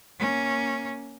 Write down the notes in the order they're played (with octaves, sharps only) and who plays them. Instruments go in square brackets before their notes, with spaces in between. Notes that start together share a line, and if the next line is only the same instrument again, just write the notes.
[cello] A#3 C#4